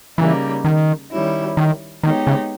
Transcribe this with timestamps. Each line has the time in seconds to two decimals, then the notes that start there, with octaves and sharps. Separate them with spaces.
0.18 C#3 E3 G3 A#3 D#4
0.64 D#3
1.11 D#3 G3 C#4 E4
1.57 D#3
2.03 D#3 G#3 B3 D#4 G4 C#5
2.27 C#3